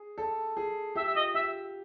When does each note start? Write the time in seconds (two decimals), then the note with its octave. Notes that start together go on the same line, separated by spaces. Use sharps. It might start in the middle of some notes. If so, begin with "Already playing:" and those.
Already playing: G#4
0.18 A4
0.57 G#4
0.95 G4 E5
1.06 E5
1.15 F4 D#5
1.34 G4 E5